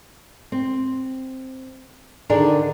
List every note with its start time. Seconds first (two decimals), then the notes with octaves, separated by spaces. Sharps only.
0.52 C4
2.30 D3 D#3 D4 G4 G#4 A#4